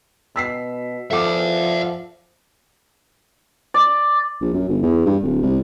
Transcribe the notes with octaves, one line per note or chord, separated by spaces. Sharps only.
B2 E6 B6 C7
F3 A4 E5 F#5 D6
D5
A#1
F#2
G1
E2
G2
D1
C2